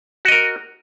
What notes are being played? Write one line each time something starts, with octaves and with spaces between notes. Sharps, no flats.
F#4 A#4 D#5